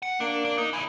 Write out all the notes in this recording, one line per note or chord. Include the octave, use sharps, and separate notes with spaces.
F#5
A#3 D4
D4
D#4
E4 A#4 G#5